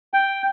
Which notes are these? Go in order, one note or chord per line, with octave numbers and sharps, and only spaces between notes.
G5